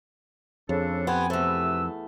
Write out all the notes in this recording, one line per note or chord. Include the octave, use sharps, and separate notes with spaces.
F2 C#3 D4 A4
B3 C4 G4 F#5 G#5
E2 C3 A3 B4 E6